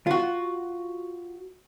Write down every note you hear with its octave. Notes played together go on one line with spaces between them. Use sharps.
F4 F#4